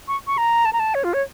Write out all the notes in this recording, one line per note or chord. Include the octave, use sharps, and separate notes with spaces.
C#6
C#6
A#5
A5
A#5
A5
C#5
F4
C#5